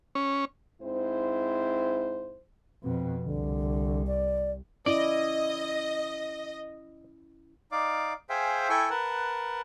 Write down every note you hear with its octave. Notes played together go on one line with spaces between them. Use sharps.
C#4
G#2 C4 E4 C5
F2 B2 C4
C2 D3
D5
C#4 E4 D5 D#5
D#4 D5 F5 D6
G#4 C5 E5 F5 G5 G#5
E4 A4 G5 G#5 C#6
A#4 B4 F#5 A5